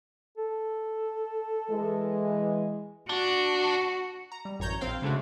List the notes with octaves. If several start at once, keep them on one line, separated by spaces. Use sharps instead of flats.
A4
E3 G#3
D4 F#4
A#5
G3
A1 F#2 C#5 A#5 G6
A#1 C4 C5 F5 G5
C#3 G#3 A3 D4 F#4